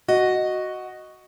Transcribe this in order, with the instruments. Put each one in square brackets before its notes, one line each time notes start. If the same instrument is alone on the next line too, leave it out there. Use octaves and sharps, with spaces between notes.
[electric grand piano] F#4 [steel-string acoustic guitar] D#5